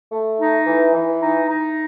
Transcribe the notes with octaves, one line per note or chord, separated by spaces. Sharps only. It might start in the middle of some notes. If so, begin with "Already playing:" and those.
A3
D#4
E3
E3
D#4
D#4